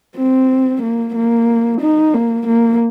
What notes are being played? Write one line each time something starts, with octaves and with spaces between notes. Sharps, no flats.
C4
A#3
A#3
D#4
A#3
A#3